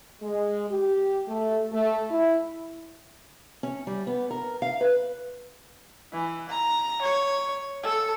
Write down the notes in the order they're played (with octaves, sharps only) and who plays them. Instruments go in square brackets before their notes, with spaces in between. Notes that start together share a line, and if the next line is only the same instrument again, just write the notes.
[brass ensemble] G#3
G4
A3
A3
E4
[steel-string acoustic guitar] C#4
G3
B3
A#4
F5
B4
[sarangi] E3
A#5
C#5
A4